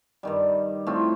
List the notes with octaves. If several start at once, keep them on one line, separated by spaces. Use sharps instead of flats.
G2 D#3 G3
A2 A3 C4 F4